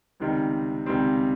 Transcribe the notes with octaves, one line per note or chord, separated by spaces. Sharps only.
C#2 C3 D#3 G3 C4
C#2 C3 D#3 G3 C4